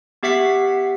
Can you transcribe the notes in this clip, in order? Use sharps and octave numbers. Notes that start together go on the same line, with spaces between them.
B3 G4 E5 F#5 B6 C7